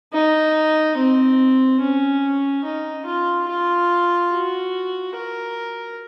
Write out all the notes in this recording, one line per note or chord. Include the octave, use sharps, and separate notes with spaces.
D#4
C4
C#4
D#4
F4
F4
F#4
A#4